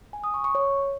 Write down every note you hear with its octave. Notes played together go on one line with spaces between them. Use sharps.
G#5
D#6
C#6
C#6
C#5